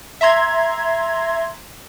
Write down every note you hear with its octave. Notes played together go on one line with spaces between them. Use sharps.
E5 A#5 C6 G#6